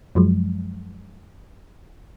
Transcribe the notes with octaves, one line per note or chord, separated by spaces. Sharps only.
F#2 F3 F#3 G#3